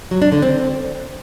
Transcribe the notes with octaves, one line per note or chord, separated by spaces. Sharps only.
F#3
D4
D3
C4